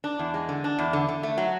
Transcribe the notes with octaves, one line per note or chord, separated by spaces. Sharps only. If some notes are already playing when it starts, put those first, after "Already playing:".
D4
E2
G#3
D3
D4
E2
D3
D3
A3
F#3